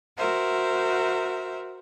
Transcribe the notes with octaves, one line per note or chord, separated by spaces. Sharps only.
F#4 A#4 C5 E5